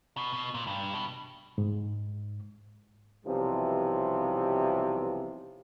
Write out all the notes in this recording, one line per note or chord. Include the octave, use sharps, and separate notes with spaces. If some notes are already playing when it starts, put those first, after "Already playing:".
B2
B2
A#2
G2
B2
G#2
B1 C3 E3 F3 G3